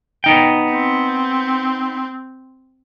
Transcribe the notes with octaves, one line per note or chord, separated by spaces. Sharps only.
B3 D#4 G5
C4